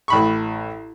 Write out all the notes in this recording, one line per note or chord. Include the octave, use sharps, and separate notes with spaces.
A1 B5 C#6